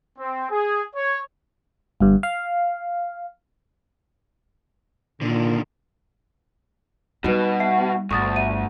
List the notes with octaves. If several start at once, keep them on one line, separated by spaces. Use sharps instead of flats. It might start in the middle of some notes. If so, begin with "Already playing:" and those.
C4
G#4
C#5
G1 G2
F5
A#2 D3 D#3
B2 G3 D#4 F#4 B4
E5 F#5 C7
G1 D2 G2 C#6 D#6 A6
E5 D#7